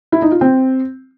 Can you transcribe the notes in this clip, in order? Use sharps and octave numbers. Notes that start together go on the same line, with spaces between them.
E4
D#4
F4
C4